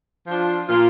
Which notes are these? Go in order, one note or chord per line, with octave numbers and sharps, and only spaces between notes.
F3 D4 F4
A#2 A#3 F4